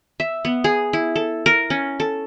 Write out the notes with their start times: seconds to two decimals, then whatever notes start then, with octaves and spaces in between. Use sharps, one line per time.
0.20 E5
0.45 B3
0.64 G#4
0.93 E4
1.16 A4
1.46 A#4
1.70 C#4
2.00 A4